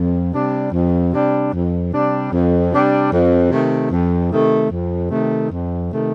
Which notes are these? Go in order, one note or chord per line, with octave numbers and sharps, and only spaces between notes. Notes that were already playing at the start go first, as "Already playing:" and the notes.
Already playing: F2
C3 G3 D4
F2
C3 G3 D4
F2
C3 G3 D4
F2
C3 G3 D4
F2
C3 D#3 A3
F2
C3 D#3 A3
F2
C3 D#3 A3
F2
C3 D#3 A3